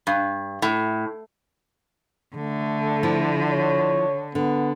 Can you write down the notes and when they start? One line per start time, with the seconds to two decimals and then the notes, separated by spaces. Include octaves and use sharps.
0.07 G2
0.62 A2
2.36 D3 A3
3.03 F3 E4
3.51 C#5
4.35 D3 B3